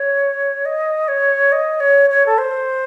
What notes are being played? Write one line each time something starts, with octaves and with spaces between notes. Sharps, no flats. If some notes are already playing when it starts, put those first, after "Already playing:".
Already playing: C#5
D#5
C#5
D#5
C#5
C#5
A4
C5